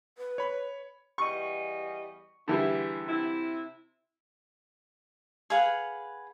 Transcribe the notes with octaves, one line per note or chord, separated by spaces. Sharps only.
B4
C#5 B5
E2 G3 D#5 C#6
E2 D3 E3 G3 G#4 E5
C3 E4
G#4 B4 F5 F#5